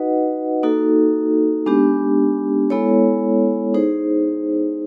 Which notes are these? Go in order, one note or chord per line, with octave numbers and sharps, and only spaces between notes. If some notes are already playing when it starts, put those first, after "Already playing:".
Already playing: D#4 F#4 B4 D#5 F#5
A#3 D#4 F#4 A4
G#3 B3 D4 G4
G#3 B3 E4 A4 C#5
D#4 G#4 C5